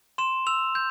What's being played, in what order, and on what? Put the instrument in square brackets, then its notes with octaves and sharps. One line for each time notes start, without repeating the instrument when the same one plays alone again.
[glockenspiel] C6 E7
E6 F7
G6